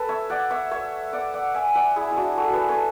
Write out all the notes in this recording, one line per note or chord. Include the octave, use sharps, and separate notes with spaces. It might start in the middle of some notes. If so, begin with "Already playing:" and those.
Already playing: A4 B4
C#5 E5
D5 F#5
C#5 E5
C#5 E5
D5 F#5
D5 F#5
E5 G#5
D5 F#5
E4 G#4
E4
D4 F#4
F#4 A4
G#4 B4
A4 C#5